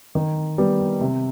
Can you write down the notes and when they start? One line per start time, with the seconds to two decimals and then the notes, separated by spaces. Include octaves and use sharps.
0.15 D#3
0.58 G3 B3
1.01 C3